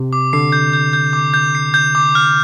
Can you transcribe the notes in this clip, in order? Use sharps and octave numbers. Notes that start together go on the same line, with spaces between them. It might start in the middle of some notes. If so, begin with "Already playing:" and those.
Already playing: C3
D6
D3 C7
G6
G6
G6
D6
G6
C7
G6
D6
F6